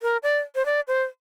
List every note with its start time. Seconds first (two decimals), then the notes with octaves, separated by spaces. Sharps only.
0.02 A#4
0.23 D5
0.55 C5
0.66 D5
0.88 C5